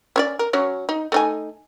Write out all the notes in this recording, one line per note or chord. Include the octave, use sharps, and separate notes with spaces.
C#4 C#5 D5
A#4
F#3 C#4 C#5
D#4
A3 D#4 G#5